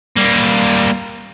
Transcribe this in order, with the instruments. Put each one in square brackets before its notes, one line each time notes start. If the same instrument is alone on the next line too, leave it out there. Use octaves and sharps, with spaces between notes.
[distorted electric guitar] G3 A#3